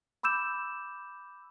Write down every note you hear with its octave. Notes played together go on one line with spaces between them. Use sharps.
B5 D6 E6 G6 E7